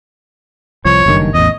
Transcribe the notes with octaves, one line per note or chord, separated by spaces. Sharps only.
C2 F3 C#5
F#1 G2 D#3
A1 E2 D#5